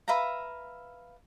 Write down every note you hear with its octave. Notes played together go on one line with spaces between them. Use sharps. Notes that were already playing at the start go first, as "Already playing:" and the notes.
B4 E5 F5 A#5